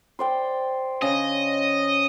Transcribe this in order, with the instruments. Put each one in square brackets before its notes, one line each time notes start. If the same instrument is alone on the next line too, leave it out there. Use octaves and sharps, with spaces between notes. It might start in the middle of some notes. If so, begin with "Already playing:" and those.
[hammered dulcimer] C5 D5 G5
[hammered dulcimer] C#3 [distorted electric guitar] D#5